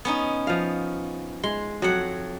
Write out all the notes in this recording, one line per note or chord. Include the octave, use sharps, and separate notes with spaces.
B3 C#4 D#4
F3 F5
G#3 C6
F2 F#3 F#5